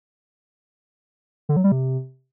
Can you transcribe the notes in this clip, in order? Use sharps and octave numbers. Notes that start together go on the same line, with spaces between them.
D3
F#3
G3
C3